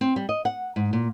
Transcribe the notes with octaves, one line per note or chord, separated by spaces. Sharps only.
C4
G3
D#5
F#5
G#2
A#2